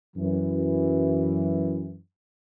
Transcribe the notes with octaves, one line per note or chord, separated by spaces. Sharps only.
F#2 E3